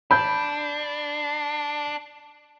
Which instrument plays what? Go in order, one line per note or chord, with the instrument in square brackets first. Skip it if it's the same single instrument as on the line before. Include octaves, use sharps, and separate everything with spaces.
[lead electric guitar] D4 [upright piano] B5 G6